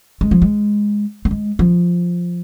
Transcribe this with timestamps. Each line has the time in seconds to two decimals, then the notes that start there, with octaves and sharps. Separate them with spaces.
0.21 G#3
0.31 F3
0.42 G#3
1.25 A#3
1.31 G#3
1.59 F3